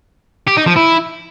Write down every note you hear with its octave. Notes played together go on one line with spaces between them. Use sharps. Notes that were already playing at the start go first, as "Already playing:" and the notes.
G4
D#4
F3
E4